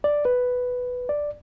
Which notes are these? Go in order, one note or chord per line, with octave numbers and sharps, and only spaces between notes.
D5
B4
D5